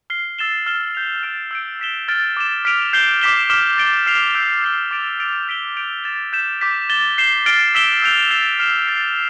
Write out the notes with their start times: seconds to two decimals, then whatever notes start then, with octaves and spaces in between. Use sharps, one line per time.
0.10 F6 C7 G7
0.39 E6 A6 E7 G7
0.66 F6 A6 E7 G7
0.95 G6 B6 F7
1.23 F6 A6 D7
1.51 E6 G6 D7
1.80 E6 B6 E7 G7
2.08 F6 A6 D7 G7
2.37 D6 A6 E7
2.65 F6 B6 D7 F7
2.93 G6 C7 G7
3.21 D6 F6 B6 E7 G7
3.50 D6 F6 B6 E7 G7
3.78 A6 D7 G7
4.07 F6 C7 F7
4.35 E6 G6 D7 G7
4.63 G6 C7 G7
4.91 D6 A6 D7 F7
5.19 E6 A6 D7 F7
5.48 G6 B6 D7 G7
5.77 G6 D7 F7
6.04 A6 E7 G7
6.33 G6 B6 E7
6.61 D6 G6 B6
6.89 A6 E7 G7
7.18 G6 C7 E7 G7
7.46 F6 A6 D7 G7
7.75 E6 B6 E7 G7
8.02 E6 G6 D7 F7
8.31 A6 C7 E7 G7
8.60 F6 C7 E7 G7
8.87 E6 A6 C7